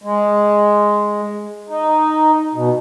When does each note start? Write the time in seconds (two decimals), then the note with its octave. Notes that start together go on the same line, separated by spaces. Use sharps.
0.04 G#3
1.70 D#4
2.55 B2